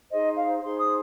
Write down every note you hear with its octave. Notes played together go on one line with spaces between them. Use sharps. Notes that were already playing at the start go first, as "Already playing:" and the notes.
D#4 G#4 C5 D#5
F5
D#4 G#4 C5 C6
D#6